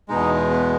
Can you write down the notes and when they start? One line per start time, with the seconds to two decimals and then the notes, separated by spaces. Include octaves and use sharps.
0.09 E2 B2 G#3 D#4
0.50 B3